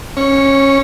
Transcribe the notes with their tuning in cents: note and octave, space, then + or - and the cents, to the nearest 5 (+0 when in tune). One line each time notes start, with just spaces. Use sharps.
C#4 -20 C#6 +0